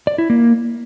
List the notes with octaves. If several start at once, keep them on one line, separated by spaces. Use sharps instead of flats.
D5
E4
A#3